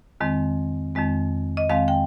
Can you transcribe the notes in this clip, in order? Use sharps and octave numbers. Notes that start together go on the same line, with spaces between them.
F2 D#3 G#3 C4
F2 D#3 G#3 C4
D#5
F2 D#3 G#3 C4 F5
G5